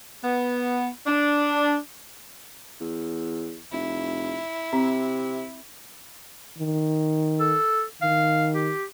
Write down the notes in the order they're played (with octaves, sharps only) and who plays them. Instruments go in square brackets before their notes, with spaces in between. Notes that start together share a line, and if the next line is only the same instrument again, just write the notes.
[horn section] B3
D4
[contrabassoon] E2
[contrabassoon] F1 [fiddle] E4
[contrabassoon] C3 [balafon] C4
[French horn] D#3
[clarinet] A4
[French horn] D#3 [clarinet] F5
[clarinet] G4